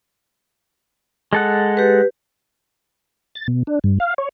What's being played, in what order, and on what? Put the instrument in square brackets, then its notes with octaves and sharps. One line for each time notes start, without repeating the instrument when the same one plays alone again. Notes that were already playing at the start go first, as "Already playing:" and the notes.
[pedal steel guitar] G#3 A4 F#5
[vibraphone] G4 B4
[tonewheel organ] A6
B2
D4
G2
F5
C#5